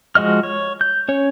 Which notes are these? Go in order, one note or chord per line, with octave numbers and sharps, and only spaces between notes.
F3 G#3 F#4 D#5 F6
C#5
G6
C#4 C#5